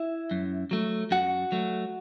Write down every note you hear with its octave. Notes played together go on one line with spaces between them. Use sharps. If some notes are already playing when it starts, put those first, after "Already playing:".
Already playing: E4 E5
F#2
F#3 A3
F#2 F#4 F#5
F#3 A3